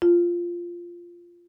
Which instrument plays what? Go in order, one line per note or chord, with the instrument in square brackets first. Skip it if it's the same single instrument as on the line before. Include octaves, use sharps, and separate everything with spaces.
[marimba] F4